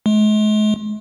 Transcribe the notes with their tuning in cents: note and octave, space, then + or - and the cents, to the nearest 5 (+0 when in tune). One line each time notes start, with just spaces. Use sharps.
G#3 +45